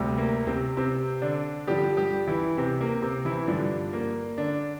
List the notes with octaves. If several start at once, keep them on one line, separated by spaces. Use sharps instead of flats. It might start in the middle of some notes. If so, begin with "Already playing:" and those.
Already playing: D2 C3 G3
A#3
C3 C4
C3 C4
D3 D4
G2 D3 F3 G3 G4
G3 G4
E3 E4
C3 C4
A#3
C3 C4
E3 E4
G2 D3 F3 D4
A#3
D3 D4